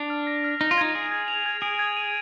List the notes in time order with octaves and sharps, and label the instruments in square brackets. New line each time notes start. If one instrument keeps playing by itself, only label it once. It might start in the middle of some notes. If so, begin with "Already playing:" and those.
Already playing: [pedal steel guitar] D4 [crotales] F7
[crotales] F6
A#6
F6
[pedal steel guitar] D#4 [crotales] F7
[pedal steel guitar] F4
[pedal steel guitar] D#4 [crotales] G#6
[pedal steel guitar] G#4 [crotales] D7
[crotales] G#6
F7
G#6
[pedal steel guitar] G#4 [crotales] D7
[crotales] G#6
D#7